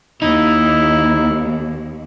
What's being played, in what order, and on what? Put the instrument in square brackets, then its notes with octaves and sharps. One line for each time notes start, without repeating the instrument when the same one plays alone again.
[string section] D#2 [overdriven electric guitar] D#4 [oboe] E4